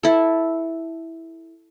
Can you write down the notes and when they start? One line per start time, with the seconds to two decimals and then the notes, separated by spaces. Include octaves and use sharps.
0.03 E4 A4